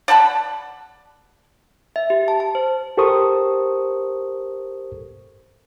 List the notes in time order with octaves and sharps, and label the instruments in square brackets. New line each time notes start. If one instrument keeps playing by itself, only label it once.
[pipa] D5 F#5 A5 B5
[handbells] E5
G4
A5
A5
C5
[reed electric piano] G4 A4 A#4 C5 C#6 D#6